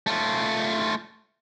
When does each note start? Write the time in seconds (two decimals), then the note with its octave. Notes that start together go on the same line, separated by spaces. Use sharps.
0.07 A3 F4